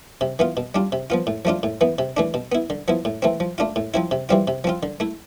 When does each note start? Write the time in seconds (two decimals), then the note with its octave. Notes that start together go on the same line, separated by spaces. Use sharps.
0.21 C3
0.39 E3 B3 F4
0.57 B2
0.75 G3 D4 F4
0.92 C3
1.10 F3 B3 F4
1.27 A2
1.45 F3 A3 D4 F4
1.63 A2
1.81 E3 B3
1.99 C3
2.17 E3 A3 D4
2.34 B2
2.52 B3 E4
2.70 D3
2.88 F3 B3 E4
3.05 A2
3.22 E3 A3 C4
3.40 F3
3.58 A3 D4 F4
3.76 A2
3.94 F3 C4 E4
4.11 C3
4.29 E3 G3 C4 F4
4.48 C3
4.64 F3 C4 F4
4.83 D3
5.00 A3 E4